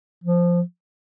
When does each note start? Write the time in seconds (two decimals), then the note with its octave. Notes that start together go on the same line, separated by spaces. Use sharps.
0.24 F3